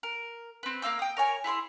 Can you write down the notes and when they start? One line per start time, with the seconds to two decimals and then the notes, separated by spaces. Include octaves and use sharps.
0.03 A#4
0.63 C4 B4
0.82 A#3 F5 E6 G6
0.99 G5 D#6
1.17 A#4 C#5 G#5
1.44 E4 G#4 B5 C6